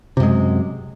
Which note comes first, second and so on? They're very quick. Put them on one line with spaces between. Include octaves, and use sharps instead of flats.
C3 F#2 G#3